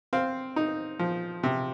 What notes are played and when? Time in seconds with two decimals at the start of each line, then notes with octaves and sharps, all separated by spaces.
0.13 C4 F5
0.56 D#4
0.99 F3
1.43 C3